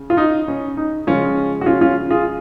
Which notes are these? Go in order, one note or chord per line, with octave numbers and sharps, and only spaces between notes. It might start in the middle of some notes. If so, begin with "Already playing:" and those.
Already playing: C#3
F4
D#4
C#4
D#4
C#3 F3 G#3 C#4 F4
F#4
C#4 F4
C#4 F4
F4 G#4